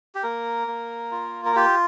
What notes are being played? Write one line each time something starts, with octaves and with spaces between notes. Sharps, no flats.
G4
A#3 A#4
A#3
F4
A#4
F4 G4